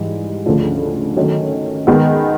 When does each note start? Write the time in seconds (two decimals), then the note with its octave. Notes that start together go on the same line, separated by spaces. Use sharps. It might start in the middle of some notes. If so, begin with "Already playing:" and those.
Already playing: G#2 E3 G3
0.46 D2 C#3 F3 A3 D4
1.17 D#3 F#3 A3 C#4
1.87 D#3 G#3 B3